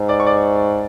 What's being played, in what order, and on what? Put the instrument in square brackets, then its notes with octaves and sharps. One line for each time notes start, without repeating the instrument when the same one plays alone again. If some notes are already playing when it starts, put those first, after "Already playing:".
Already playing: [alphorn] G#2
[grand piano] D5 D6
C#6
D5 D6